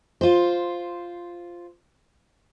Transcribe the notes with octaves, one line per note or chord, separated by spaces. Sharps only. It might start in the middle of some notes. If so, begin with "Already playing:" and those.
F4 C5